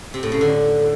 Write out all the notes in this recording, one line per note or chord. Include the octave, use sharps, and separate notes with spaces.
C3
A2
C#3
D3